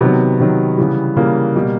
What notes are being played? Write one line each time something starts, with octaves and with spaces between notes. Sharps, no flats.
C3 D#3 F#3 B3
C3 D#3 F#3
C#3 E3 G3
C#3 E3 G3 A#3
B2 G3